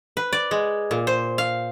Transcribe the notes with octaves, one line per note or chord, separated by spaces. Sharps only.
B4
D5
G#3
A#2
C5
F5